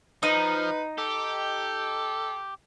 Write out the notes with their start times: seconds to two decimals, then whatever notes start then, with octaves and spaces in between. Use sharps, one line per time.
0.23 F3 D#4 B4
0.98 G4 A4